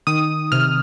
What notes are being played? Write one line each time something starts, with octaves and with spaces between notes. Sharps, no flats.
D#3 D#6
C3 F6